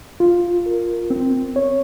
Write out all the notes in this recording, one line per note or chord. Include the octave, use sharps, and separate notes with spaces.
F4
A#4
C4
C#5